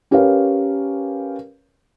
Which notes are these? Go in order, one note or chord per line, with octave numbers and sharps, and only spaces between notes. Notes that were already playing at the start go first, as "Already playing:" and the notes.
C#4 G4 A#4 B4 C#5 F5